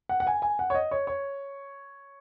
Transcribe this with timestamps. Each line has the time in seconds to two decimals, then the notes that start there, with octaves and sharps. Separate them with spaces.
0.09 F#5
0.20 F#5
0.27 G#5
0.42 G#5
0.59 F#5
0.70 C#5
0.75 D#5
0.91 C#5
1.07 C#5